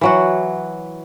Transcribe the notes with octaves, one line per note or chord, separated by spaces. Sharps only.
E3 F#3 F#4